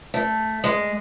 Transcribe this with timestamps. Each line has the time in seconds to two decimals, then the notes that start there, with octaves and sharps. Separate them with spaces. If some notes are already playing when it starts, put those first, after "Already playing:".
0.14 A3
0.64 G#3